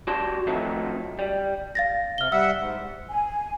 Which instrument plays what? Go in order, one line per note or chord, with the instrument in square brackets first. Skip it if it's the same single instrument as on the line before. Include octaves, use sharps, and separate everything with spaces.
[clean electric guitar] G3 F#4 G4 A5 C6
D#3 F3 F#3 A3 C4 D#4
G3
[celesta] F5 A6 A#6
[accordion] C3 [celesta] F6 G7
[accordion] G3 E5 F#5 [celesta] E6
[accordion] G#2
[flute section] G#5